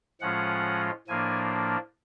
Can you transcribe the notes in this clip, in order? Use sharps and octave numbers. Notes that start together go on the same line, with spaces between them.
A2 F3 G#3 C#4 F4 F#5
A2 F3 A#3 D4 G#5